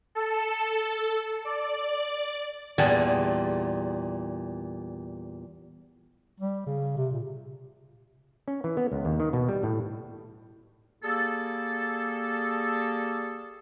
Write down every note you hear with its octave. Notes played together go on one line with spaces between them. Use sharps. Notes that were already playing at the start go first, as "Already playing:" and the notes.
A4
D5
E2 A#2 G3 G#4 F#5 A5
G3
C#3
C3
A#2
C#4
E3
B3
C#2
D#2
D#3
B2
G3
A2
G3 A#3 G#4 A4